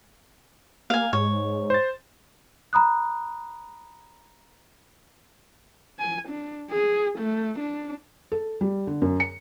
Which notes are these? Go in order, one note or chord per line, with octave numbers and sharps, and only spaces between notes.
A#3 F5 G#5
G#2 C#5
C5 A6
A#5 B5 D#6 F#6
G#5
D4
G#4
A3
D4
A4
G3
D3
F#2
C#7